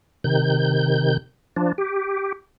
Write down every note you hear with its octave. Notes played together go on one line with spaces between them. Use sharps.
C3 D#3 G6
F3 D4
G4